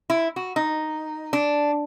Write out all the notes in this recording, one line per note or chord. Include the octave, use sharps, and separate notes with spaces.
E4
F#4
D#4
D4